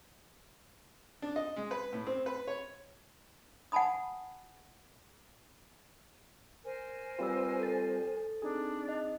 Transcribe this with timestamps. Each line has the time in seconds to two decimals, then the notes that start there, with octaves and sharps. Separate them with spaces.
1.22 D4
1.36 D#5
1.56 G#3
1.71 B4
1.93 A2
2.07 C4
2.26 B4
2.47 C#5
3.72 F#5 G#5 A5 B5 D#6
6.64 A#4 C5 G#5
7.19 G3 C4 F4 B4 E6
7.59 A4 A6
8.42 C4 D4 D#4 G#4
8.89 D#5